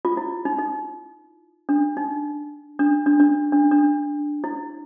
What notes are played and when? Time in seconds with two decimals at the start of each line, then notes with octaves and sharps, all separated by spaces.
0.05 F4
0.17 E4
0.45 D#4
0.58 D#4
1.69 D4
1.97 D#4
2.79 D4
3.06 D4
3.20 D4
3.53 D4
3.71 D4
4.44 E4